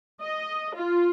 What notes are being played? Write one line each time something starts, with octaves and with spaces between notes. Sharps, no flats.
D#5
F4